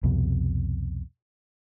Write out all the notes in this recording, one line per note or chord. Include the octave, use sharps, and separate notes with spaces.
C2 F2 B2